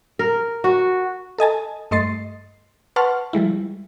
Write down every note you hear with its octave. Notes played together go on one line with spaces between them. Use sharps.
A#4
F#4
A4 D#5 G#5 A5
G2 A3 D#5 C6 A6 C7
B4 F#5 A5 C6 C#6 F6
F3 G3 G#3 E4